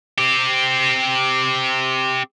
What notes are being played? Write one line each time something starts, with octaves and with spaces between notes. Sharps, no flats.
C4 G4